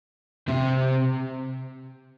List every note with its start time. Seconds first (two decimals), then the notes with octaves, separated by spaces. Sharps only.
0.48 C3 C4